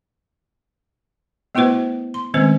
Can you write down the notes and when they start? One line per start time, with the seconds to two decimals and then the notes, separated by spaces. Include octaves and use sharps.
1.55 A3 B3 E4 F#4 B4 C5
2.14 C6
2.34 D#3 G#3 A3 C4 C#4 C5